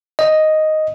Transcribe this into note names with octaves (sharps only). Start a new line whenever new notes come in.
D#5